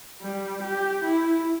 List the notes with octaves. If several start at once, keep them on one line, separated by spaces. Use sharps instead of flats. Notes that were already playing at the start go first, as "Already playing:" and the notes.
G3
G4
E4